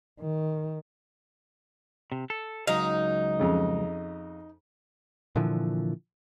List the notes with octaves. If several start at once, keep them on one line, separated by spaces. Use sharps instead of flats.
D#3
C3
A4
C#2 F#3 D#4 F5
F2 C#3
A#2 D3 E3 F3